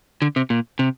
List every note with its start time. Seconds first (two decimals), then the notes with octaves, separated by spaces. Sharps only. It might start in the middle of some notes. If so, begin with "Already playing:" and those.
0.22 D3
0.36 C3
0.50 A#2
0.79 C3